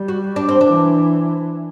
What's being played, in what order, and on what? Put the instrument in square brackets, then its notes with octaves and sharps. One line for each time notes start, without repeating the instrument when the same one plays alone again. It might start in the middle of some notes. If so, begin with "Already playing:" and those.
Already playing: [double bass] G3
[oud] F#4
D4
C4
[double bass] E3 [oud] D4